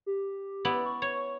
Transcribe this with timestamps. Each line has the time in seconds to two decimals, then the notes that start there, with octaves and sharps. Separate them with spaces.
0.06 G4
0.65 B3 E4 D5
0.85 C#6
1.02 C#5